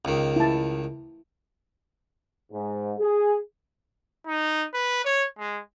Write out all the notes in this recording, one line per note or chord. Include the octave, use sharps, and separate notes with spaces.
C#2 D#3
E4 A5
G#2
G#4
D#4
B4
C#5
G#3